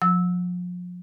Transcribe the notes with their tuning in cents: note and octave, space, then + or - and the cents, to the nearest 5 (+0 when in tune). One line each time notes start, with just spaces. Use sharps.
F3 +35 E6 -15